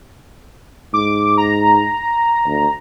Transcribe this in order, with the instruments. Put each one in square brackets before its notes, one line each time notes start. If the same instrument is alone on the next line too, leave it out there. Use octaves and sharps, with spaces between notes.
[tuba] G#2 [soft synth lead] D6
[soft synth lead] A#5
[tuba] D2